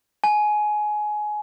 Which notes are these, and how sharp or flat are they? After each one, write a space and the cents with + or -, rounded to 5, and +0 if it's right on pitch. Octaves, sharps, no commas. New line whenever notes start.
G#5 +20